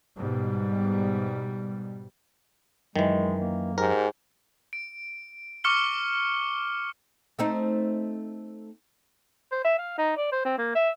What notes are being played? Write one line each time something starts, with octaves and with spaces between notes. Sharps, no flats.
G#2 B2 G3
F#2 D#3 E3 G#3
A#3
G#2 G4 A#4
D7
C#6 D6 F6 C#7 G7
A3 C4 D#4
C5
E5
F5
D#4
D5
C5
C4
A#3
E5